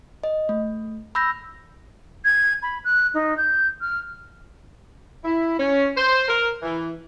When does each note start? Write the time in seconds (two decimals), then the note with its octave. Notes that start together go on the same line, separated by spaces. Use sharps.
0.24 D#5
0.49 A3
1.15 B5 E6 G6 A#6
2.24 G#6
2.62 B5
2.84 F#6
3.14 D#4
3.37 G6
3.81 F6
5.24 E4
5.59 C#4
5.97 C5
6.28 A#4
6.63 E3